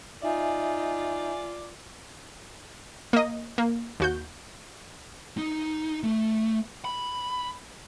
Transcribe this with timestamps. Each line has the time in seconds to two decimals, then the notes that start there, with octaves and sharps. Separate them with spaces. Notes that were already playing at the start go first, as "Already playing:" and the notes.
0.22 D#4 F4 D5 E5 G#5
3.13 A#3 D#5
3.58 A#3
4.00 D#2 F#4 G6
5.38 D#4
6.03 A3
6.85 B5